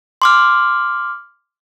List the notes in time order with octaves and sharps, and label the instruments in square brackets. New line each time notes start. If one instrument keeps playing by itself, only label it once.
[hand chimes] C6 D6 F6